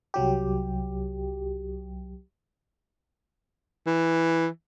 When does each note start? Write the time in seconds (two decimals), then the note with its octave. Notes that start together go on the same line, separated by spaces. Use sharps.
0.14 C2 F#3 G4
3.87 E3